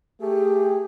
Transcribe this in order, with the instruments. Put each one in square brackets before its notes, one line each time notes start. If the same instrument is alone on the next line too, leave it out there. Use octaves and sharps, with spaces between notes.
[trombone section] A3 G#4 [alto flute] G4